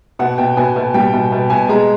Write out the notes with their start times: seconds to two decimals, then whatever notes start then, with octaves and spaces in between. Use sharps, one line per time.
0.19 B2 F#5
0.38 B2 G5
0.57 B2 G#5
0.76 B2
0.94 G3 G5
1.13 B2
1.32 B2
1.50 B2 G#5
1.69 G#3 A#5